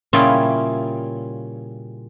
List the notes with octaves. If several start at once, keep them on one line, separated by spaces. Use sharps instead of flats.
A#2 C#3 G3 C#4 E4 F4